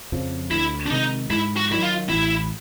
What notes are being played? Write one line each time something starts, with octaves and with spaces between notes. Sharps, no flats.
F2 C#3 F3
D2 E4
D4
C3 D#3 G#3 D#4
G#2 E4
F#4
D#3 F#3 E4
F4
A1 E4